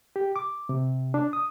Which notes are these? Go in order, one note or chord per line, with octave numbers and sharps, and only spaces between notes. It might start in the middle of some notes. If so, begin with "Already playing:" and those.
G4
D6
C3
D4
D#6